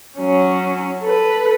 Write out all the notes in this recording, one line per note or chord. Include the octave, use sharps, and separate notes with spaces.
F#3 C#4
A4 B4